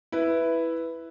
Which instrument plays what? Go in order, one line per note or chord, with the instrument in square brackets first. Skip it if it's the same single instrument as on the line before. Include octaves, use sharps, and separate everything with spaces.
[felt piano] E4 B4